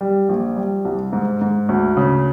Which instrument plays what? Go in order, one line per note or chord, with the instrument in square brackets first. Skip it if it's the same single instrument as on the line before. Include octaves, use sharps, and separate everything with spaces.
[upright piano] G3
A#1
G3
C2
G#2
G#2
D2
C#3